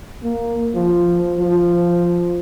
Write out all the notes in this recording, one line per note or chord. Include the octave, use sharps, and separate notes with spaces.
A#3
F3
F3